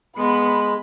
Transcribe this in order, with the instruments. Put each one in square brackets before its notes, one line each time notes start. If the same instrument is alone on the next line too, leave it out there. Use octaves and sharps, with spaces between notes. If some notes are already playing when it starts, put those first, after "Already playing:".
[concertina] G#3 [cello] B3 [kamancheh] B5